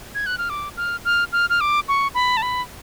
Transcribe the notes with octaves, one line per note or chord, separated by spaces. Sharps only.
G#6
F#6
F6
D6
F6
F6
F6
F6
D6
C#6
B5
A5
B5